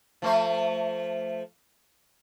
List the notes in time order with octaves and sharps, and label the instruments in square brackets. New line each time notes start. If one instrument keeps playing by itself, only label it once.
[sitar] F3 A3 C5